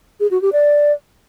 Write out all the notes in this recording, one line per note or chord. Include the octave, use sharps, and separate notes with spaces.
G#4
F#4
G4
D5